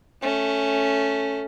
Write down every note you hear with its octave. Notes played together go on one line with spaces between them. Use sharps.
A3 C#4